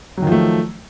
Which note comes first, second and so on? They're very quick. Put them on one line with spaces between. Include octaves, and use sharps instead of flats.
F#3 D#3 F3 A3